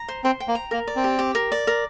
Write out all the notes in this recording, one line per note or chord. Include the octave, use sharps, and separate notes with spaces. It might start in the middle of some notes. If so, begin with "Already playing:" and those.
Already playing: A#5
C5
C4 C5
G5
A#3
A#5
A#3 A#4
D5
C4
G4
G4
A#4
D5
A#4